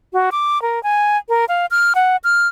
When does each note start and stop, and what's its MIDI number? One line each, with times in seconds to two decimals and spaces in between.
0.13 0.30 66
0.32 0.61 86
0.62 0.82 70
0.83 1.17 80
1.29 1.45 70
1.49 1.66 77
1.71 1.93 89
1.95 2.16 78
2.24 2.48 89